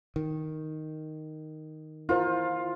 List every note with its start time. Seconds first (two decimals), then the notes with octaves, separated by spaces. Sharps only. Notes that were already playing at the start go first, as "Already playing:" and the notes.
0.16 D#3
2.09 E4 F4 A#4 C5